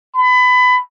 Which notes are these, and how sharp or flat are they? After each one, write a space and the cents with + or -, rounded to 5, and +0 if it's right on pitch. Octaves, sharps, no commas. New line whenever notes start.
B5 +25